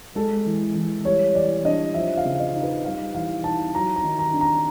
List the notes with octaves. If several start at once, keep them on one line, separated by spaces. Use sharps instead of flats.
G#3 A4
E3
E3
G3 C#5
E3 D5
D4 D#5
F3 E5
F5
C#3
D#5
D#4
B4
G3 F5
E3 F5
D#4 A5
F#3 A#5
A#5
D#3
A#5
D4
A#5